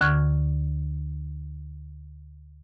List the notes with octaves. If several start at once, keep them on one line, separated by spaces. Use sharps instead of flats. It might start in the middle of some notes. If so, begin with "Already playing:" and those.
D2 D3 C#6 F6 G#6